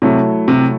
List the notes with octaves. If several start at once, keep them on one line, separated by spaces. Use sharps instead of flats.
C3 F#3 A3 E4
C3